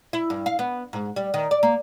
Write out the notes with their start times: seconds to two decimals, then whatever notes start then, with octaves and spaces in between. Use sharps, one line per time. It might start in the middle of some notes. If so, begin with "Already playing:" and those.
0.13 E4
0.30 G2
0.46 F5
0.59 B3
0.93 G#2
1.16 G3
1.34 D#3
1.51 D5
1.63 A#3